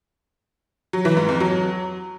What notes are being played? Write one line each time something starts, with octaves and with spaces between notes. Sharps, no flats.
F#3
E3
G#2
F2
F#3